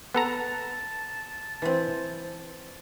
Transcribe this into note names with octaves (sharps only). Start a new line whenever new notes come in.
B3 A4 A5 A#5
E3 C4